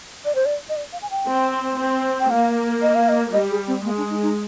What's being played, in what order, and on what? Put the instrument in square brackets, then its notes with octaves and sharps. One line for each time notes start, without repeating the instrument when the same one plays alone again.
[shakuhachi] D5
C5
D5
D#5
D5
F5
G#5
G5
[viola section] C4
C4
[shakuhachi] G5
[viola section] A#3 [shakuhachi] F5
[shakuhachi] D#5
F5
D#5
[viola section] G3 [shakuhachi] D#5
[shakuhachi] G#4
C4
[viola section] G#3 [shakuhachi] A#3
[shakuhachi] D4
D#4
D#4